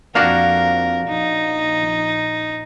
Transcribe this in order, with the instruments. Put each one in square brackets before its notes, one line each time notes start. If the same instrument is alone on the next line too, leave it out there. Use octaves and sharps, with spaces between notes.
[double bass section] F2 [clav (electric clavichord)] A#3 D4 F#4 [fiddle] A#4 [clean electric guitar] F5
[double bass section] A#1 [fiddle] D#4